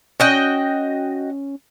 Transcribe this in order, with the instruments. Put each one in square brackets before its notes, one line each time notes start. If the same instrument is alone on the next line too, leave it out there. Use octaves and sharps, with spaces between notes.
[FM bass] C#4 [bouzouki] F#4 D#5 G5